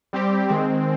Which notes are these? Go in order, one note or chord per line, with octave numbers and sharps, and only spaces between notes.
G3 C4 G4
D#3 G#3 C4